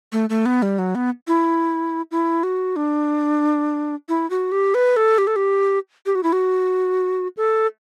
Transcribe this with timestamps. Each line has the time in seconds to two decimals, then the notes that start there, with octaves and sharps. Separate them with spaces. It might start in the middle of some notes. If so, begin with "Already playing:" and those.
0.12 A3
0.30 A3
0.46 B3
0.62 G3
0.79 F#3
0.95 B3
1.28 E4
2.11 E4
2.43 F#4
2.76 D4
4.09 E4
4.30 F#4
4.52 G4
4.74 B4
4.96 A4
5.18 G4
5.27 A4
5.36 G4
6.06 G4
6.15 F#4
6.23 E4
6.33 F#4
7.37 A4